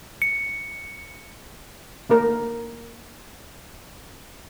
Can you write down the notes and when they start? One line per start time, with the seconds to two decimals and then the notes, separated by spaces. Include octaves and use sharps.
0.22 C#7
2.10 A3 A#3 A#4